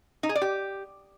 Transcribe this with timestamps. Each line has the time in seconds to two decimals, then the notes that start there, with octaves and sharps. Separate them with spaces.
0.23 D#4
0.29 G#4
0.35 D5
0.42 G4